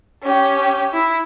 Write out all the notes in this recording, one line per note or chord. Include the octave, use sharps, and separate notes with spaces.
C#4 G4
E4